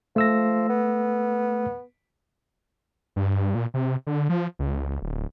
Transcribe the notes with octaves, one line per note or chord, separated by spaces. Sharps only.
F3 A3 E6 A#6
B3
G2
A#2
C3
D3
F3
C#2
D1